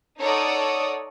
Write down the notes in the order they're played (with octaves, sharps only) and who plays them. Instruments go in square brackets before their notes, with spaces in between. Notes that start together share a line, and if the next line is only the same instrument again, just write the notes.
[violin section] D#4 A4 C#5 D5 F#5 D#6